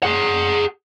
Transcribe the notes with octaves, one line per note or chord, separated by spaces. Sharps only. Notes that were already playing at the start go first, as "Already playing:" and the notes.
G#4 F#5